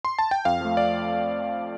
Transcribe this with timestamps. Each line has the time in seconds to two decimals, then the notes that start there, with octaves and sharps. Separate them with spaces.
0.05 C6
0.19 A5
0.31 G5
0.45 F2 F5
0.61 F3 A3
0.77 D5